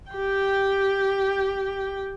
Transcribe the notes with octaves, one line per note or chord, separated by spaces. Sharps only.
G4 G5